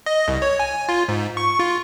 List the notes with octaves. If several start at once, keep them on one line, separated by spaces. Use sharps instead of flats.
D#5
C2
C#5
G#5
F4
G#2
C#6
F4